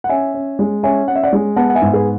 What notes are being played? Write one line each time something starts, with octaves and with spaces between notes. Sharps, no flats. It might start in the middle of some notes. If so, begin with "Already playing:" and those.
F#5
C#4 E5 G#5
C#4
G#3
C#4 E5 G#5
C#4 F#5
E5
D5 F#5
G#3
B3 F#5 A5
F#5
E5 G#5
G#2
G#4 B4